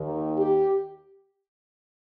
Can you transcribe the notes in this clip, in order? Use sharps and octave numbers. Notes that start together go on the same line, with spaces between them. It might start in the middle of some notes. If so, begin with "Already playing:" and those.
Already playing: D#2 D#3
G4